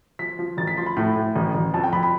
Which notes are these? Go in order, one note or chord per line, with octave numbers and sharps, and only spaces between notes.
F3 B6
F3
A1 A6
B6
F3 C6
B5
A2 B5
A2
A1
A1
F2 A5
G5
F2 B5
B5